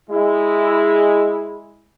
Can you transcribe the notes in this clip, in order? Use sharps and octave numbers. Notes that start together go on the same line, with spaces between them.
G#3 E4